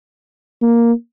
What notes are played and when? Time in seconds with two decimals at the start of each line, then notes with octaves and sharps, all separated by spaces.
0.62 A#3